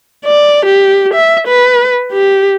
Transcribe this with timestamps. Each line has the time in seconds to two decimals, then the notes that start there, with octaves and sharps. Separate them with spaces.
0.25 D5
0.65 G4
1.13 E5
1.47 B4
2.12 G4